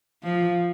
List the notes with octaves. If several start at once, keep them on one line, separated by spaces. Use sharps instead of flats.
F3